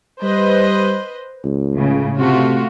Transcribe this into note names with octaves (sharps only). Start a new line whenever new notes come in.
G3 B4 C5 D#5
C#2
A2 C#3
C3 A3 F4 F#4